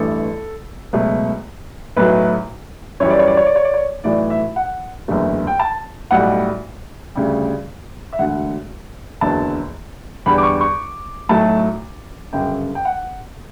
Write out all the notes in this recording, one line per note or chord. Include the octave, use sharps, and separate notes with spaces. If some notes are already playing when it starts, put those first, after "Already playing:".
Already playing: A1 G2 E3 A3 A4
C#2 B2 F#3 A3
B1 A2 F#3 A3 B4
F#2 E3 G3 C#5
D5
C#5
D5
C#5
D5
C#5
D5
C#5
B1 A2 E3 A3 D5
E5
F#5
F#1 E2 D3 A3
G5
A5
B1 A2 G3 F#5
D2 C#3 G3
E5
E1 D2 D3 F#5
F#1 E2 D3 F#3 A5
E2 D3 G3 B5
D6
C#6
C#6
B1 A2 F#3 A3 A5
G1 F#2 C#3 G5
G5
F#5